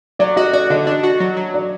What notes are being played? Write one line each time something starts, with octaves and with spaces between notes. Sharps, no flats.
F#3 D5
F#4 D#5
F#4 D5
D3 D#5
D4
F#4
F#3
F#3
D5